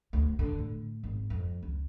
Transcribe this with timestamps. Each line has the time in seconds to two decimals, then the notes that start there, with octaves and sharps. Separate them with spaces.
0.13 D2
0.39 D3
0.58 A2
1.04 G#1
1.30 F2
1.63 C#2